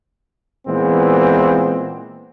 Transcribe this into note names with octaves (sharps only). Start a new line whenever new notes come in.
A#2 E3 G#3 B3 C4